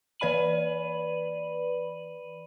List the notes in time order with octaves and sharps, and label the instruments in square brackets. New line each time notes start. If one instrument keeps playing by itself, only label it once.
[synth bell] E3 B4 D5 B5 D#7 F#7